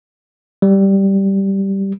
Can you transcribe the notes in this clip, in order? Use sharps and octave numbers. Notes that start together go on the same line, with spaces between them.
G3